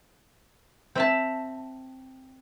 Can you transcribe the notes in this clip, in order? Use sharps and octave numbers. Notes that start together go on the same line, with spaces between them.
C4 E5 A5